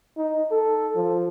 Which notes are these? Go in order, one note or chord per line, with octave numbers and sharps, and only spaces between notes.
D#4
A4
F3